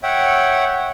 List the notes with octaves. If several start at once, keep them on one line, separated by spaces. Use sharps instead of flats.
C#5 E5 F#5 G5